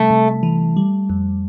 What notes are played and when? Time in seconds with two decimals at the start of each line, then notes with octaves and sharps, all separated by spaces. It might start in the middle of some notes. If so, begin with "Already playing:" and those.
Already playing: C3 G3 A3
0.11 C3
0.43 E3
0.77 G3
1.10 F2